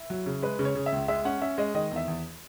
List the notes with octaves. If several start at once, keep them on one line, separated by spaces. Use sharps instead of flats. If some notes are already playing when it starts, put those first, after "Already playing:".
Already playing: E4
F#3
C#3
G#3 B4
C#3
C#5
C#3
E5
C#2
G#3 E5
C#4 F#5
C#4 E5
G#3 D#5
D#3 D#5
E2 E5
E2